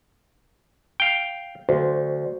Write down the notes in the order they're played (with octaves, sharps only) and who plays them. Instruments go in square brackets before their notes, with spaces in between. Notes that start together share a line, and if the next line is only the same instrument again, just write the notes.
[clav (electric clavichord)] F5 G5
[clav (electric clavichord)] D2 [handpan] F#4 C5